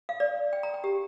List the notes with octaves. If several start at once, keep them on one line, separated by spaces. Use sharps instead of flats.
F5
D5
G5
A#5
G5
G4